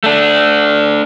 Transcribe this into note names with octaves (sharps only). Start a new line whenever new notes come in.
A3 D4